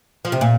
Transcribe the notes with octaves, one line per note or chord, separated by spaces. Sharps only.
F3
C3
A#2